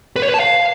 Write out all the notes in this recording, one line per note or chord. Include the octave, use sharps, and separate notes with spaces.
B4
C#5
B4
A5
F5